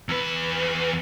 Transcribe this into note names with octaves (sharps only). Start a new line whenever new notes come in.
E2 B4